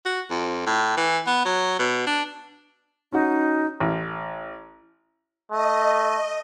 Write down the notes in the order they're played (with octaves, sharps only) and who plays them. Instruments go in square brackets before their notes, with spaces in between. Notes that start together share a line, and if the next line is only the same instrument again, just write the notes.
[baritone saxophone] F#4
F2
A2
E3
B3
F#3
B2
D4
[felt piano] C#4 F#4 [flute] D#4
[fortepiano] A1
[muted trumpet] A3 [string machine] D#5